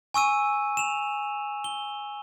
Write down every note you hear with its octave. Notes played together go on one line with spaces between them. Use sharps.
G#5 C#6 E6 D#7
E7 F7
G7